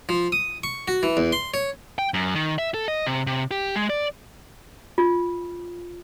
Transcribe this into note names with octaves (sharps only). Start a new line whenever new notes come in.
F3
D#6
C#6
F#4
E3
E2
C6
C#5
G5
F#2
D#3
E5
A4
D#5
C3
C3
G4
G#3
D5
F4